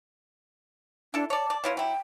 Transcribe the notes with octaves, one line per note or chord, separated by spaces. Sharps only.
D4 E4 A4
C#5 D5 A5
D5
B2 E4 F4 C#5
F#3 E4 G5